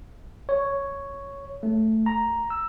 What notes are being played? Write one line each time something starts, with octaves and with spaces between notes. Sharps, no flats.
C#5
A3
A#5
E6